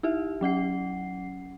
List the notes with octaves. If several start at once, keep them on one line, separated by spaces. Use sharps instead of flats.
D#4 E4 G4 E5
F#3 C#4 F#5 C7